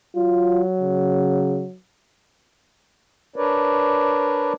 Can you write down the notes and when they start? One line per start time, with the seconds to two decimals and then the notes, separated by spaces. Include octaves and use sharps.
0.16 F#3 F4
0.80 C#3
3.36 D4 A#4 B4 C#5 D5